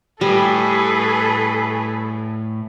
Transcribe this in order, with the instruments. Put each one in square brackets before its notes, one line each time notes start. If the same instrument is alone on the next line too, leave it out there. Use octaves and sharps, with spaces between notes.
[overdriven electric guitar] A2 [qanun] G3 [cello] G#4 B4 [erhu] A4